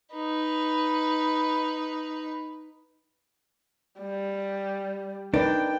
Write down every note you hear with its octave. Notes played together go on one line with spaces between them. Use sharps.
D#4 B4
G3
D4 D#4 A#4 B4 G5